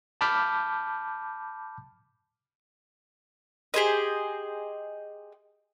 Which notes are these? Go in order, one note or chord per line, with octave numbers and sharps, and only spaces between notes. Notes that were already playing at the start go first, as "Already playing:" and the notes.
A5 B5 D6 F6 G6 B6
G4 G#4 C5 D#5